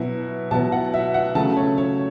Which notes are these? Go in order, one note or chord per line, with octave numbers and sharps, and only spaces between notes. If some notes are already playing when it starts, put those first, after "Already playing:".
Already playing: B2 F#3 B3 E4
B2 F#3 B3 E4 A5
F#5
E5
F#5
C#3 F#3 A3 A5
C#5
C#5